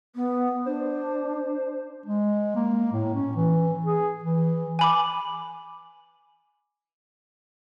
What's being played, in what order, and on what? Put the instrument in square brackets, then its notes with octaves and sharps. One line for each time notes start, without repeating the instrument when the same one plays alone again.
[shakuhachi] B3
[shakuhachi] D4 [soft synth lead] C5
[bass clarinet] G#3
A#3
A2
C#4
E3
G#4
E3
[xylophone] G#5 B5 D6